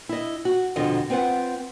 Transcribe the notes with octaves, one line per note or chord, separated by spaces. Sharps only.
E4 D#5
F#4
F2 B2 D3 F4 D#5
C4 F4 B4 F#5